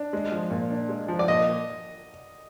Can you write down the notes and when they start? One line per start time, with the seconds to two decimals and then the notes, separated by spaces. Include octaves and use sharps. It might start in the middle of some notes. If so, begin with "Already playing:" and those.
Already playing: D4
0.13 G#3
0.32 F3
0.51 A#2
0.70 D4
0.89 G#3
1.08 F3
1.19 D5
1.28 A#2 D#5